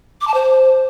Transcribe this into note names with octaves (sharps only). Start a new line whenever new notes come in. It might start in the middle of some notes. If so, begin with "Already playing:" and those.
D6
A5
C5